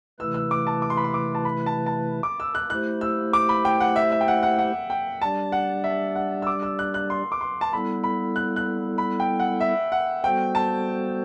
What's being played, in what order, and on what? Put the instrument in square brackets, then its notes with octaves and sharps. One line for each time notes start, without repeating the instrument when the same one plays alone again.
[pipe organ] C3 E3 A3 E4 B4 [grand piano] E6
[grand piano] E6
D6
A5
D6
C6
B5
C6
D6
A5
B5
A5
A5
D6
E6
F#6
[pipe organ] A3 E4 G4 C5 [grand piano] F#6
[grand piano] E6
D6
B5
G5
F#5
E5
E5
G5
F#5
F#5
F#5
G5
[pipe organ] G3 D4 G4 D5 [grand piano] A5
[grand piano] F#5
E5
F#5
E6
D6
E6
F#6
F#6
C6
D6
C6
A5
[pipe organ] G3 B3 E4 A4 [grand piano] B5
[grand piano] B5
F#6
F#6
B5
G5
F#5
E5
F#5
[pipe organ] G3 B3 F#4 A4 C5 [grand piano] G5
[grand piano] A5